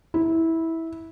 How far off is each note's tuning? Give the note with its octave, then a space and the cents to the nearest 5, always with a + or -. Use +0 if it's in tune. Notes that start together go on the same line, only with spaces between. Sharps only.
E4 -15